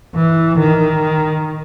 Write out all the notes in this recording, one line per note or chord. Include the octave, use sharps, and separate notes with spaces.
E3
D#3